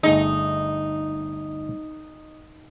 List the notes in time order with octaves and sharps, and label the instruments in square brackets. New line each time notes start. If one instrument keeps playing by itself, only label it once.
[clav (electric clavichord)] G1 A3 G#4 [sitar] D#4